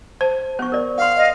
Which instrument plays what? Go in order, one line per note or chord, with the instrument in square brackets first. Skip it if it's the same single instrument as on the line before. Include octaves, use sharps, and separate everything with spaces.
[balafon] C5 [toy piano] A5
[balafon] B3 [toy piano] C5 C#6
[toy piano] A#4 D5
[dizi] F5 [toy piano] F#5 C6
[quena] D#5